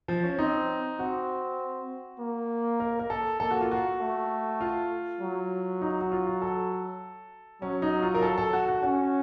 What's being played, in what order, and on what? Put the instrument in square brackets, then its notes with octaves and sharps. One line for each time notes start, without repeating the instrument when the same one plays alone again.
[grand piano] F3
C#4
[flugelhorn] C4 [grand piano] D#4
[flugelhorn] C4 [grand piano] F#4
[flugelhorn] A#3
[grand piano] A#4
A#4
A4
[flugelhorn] A#3 [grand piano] A4
[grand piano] F#4
F4
F#4
[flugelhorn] A3
[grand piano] F4
[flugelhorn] F#3
[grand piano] D#4
F#4
F4
F#4
A4
[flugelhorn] F#3 [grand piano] C#4
[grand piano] D#4
F4
A#4
A4
A4
F#4
F#4
[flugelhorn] C#4 [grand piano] F#4